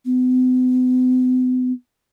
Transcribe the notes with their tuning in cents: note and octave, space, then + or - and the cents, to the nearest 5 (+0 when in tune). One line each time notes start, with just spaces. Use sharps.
B3 +45